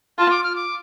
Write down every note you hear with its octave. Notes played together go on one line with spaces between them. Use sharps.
F4 A5
D6
F6
D6